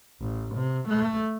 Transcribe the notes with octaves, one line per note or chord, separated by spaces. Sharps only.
A1
C3
A3